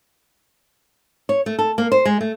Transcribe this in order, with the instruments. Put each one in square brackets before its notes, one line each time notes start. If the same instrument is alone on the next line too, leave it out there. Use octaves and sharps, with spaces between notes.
[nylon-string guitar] C#5
A3
A4
A#3
C5
G#3
A3